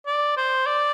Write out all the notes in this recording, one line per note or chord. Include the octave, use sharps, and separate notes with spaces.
D5
C5
D5